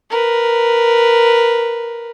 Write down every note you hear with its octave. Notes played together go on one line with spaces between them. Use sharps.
A#4 B4